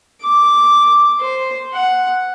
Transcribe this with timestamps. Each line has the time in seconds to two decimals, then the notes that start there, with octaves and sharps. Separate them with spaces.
0.22 D6
1.20 C5
1.74 F#5